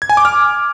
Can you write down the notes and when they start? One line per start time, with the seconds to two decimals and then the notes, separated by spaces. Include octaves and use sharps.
0.02 G#6
0.09 G#5
0.17 D6
0.25 F6